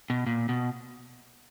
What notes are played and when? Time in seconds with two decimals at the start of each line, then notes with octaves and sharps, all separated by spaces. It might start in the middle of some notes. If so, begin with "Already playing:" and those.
0.10 B2
0.26 A#2
0.49 B2